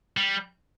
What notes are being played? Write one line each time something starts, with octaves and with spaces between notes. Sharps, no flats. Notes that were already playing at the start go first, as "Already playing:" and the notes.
G3